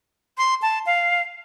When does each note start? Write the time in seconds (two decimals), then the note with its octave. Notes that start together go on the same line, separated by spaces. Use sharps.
0.38 C6
0.62 A5
0.86 F5